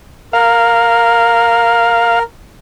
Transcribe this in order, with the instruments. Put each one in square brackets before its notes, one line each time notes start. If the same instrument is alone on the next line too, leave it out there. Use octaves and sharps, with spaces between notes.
[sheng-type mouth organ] A#4 [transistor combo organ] F5